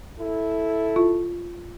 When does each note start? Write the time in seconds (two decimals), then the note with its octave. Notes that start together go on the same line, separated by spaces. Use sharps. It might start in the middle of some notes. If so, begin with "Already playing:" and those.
0.19 E4 A4
0.96 F4